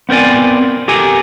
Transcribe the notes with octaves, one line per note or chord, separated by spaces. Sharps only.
B3 C4 A#4 D5 G#5
G4 A4 A#4 G#5